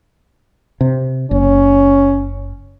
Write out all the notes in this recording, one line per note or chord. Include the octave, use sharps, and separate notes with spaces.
C3
F#1 C#4